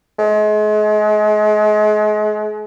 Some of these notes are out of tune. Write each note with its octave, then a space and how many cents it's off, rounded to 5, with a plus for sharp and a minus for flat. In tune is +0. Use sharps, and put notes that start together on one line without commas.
G#3 +35